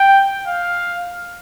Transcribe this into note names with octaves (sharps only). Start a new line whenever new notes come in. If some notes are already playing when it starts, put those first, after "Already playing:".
Already playing: G5
F5